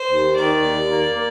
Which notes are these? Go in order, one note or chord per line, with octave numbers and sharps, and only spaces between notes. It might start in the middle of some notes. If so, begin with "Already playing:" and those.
Already playing: C5
D#2
D#3 D5
D#2
A#3
A#3